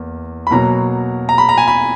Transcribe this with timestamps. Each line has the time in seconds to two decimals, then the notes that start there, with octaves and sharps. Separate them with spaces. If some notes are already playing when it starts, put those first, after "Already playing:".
Already playing: E2 A#3
0.47 B5
0.51 B2 F#3 A#3 A#5
1.29 A#5
1.38 B5
1.49 A#5
1.58 G#5
1.68 B5